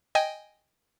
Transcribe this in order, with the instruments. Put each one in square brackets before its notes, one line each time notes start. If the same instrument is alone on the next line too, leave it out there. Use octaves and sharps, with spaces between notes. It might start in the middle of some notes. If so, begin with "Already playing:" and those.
[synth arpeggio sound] D#5 G5 G#5